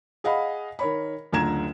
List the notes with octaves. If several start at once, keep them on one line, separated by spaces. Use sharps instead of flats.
G#4 D#5 F5 F#5 B5
D#3 A#4 C#5 B5
F#1 D2 F4 A#5 G#6 E7